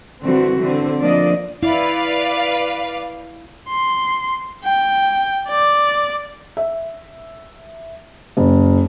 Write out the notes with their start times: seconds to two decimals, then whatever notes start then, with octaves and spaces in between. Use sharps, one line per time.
0.23 D3 E3 G3 C4 F#4
0.59 D3 E3 C4
0.99 F3 A#3 D4 D5 D#5
1.63 E4 B4 D5 F5
3.69 C6
4.65 G5
5.49 D5
6.57 E5
8.37 F#1